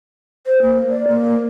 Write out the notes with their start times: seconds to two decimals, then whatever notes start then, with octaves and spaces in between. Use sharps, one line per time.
0.46 C5
0.62 A#3
0.90 D5
1.08 A#3